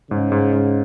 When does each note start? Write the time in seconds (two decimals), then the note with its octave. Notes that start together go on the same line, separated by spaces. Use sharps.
0.10 G#2 C#3
0.32 G#2
0.53 G#2